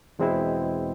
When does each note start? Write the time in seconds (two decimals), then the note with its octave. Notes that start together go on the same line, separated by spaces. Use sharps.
0.19 E2 B2 G#3 C4 E4